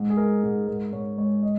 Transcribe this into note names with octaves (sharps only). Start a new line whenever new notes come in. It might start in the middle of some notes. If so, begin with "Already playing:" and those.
Already playing: G#2 G#3
G#4
G#3 A#4
G#2 G#4
G#2 A#4
G#2 C#5
G#3 C#5
D#5